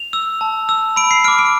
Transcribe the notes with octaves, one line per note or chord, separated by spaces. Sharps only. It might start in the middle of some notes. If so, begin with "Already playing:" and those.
Already playing: F7
E6
A5
E6
B5 D7
C7
D6 F6 D7
D7